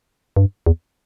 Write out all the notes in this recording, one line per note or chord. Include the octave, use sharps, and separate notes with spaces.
G2
E2